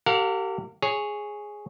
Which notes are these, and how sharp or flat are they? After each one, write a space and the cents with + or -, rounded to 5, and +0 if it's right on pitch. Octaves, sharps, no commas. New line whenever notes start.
G4 -30 A#4 -40 F5 +35
G#4 +0 C#5 +0